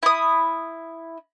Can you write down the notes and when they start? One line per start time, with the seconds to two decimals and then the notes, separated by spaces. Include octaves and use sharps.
0.03 E4 D#6